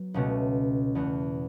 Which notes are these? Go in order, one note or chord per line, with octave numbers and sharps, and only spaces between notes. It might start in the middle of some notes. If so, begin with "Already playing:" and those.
Already playing: F#3 B3
C#2 B2 A3 C#4 F#4
E2 B2 A3 F#4